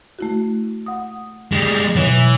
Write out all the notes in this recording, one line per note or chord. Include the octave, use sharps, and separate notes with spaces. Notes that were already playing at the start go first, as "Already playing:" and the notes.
A3 E4 F#4
F#5 D#6
G3 G#3
B2 E3 F#3 C#5